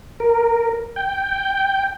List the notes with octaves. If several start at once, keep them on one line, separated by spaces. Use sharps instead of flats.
A#4
G5